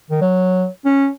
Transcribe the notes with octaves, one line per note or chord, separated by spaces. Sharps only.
D#3
F#3
C#4